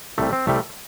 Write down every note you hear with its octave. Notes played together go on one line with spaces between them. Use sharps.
C2 C3 G3 A3
C4
C2 C3 G3 A3